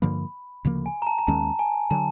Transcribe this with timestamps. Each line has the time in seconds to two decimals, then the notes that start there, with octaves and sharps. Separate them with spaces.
0.02 G2 D3 F3 A#3 B5
0.65 D2 C#3 F3 A#3
0.86 G#5
1.02 A#5
1.07 A5
1.19 A#5
1.27 D#2 D#3 G#3 C#4 A5
1.59 G#5
1.90 D3 F#3 A5